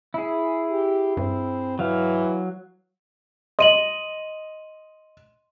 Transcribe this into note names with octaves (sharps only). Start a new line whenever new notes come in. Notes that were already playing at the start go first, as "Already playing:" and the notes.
E4 G#4
G4
G2 C4
E3 F#3 F5
D#5 C6 D#7 F#7